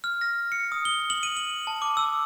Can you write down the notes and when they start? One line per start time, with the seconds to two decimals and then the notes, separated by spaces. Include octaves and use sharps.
0.04 F6
0.21 A#6
0.52 C#7
0.72 D#6
0.85 G7
1.10 F#7
1.23 D#7
1.37 F#7
1.67 A5
1.82 D6
1.97 E6